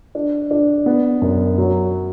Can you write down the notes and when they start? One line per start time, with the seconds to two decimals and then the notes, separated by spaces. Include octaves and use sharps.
0.15 D4
0.51 D4
0.86 B3
1.22 F#2
1.58 F#3